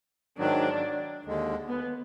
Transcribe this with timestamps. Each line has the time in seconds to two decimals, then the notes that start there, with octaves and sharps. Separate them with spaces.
0.39 G#2 D#3 F#3 D4
1.25 D#2 D3 G#3
1.69 B3